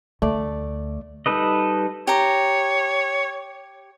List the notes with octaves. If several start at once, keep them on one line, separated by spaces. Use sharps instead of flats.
D2 A3 D5
G3 D#4 A4 B4 D#5
G4 C#5 A#5